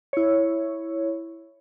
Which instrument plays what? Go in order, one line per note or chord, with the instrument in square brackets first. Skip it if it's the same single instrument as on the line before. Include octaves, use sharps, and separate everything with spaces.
[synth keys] E4 C#5